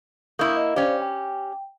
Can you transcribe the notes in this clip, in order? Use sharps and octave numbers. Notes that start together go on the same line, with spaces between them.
A#3 E4 C#6 D#6 G6
D#5
C#4 G4 C5 D5 F5
G5